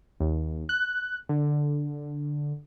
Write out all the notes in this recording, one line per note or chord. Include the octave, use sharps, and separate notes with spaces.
D#2
F#6
D3